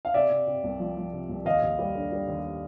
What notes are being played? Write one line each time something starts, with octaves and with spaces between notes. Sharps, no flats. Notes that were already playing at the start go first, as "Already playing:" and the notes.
F5
C3 D5 E5
C3
C3
C2
F3
F3
C3
C2
D#2 D#5 F5
D#2
G3
D3
G3
D#2